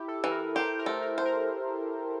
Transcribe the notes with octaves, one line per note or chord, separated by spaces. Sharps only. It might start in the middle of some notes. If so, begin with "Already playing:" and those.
Already playing: E4 G4
A4
E3
A#4
G4 C5
A#4
A3
A#4
C5
A#4